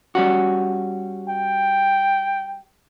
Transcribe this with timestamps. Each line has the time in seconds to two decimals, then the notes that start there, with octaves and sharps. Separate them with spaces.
0.15 G3 C#4 F#4
1.28 G5